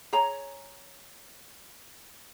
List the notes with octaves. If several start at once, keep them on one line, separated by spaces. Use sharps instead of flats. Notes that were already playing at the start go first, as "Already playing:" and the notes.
G#4 C#5 A#5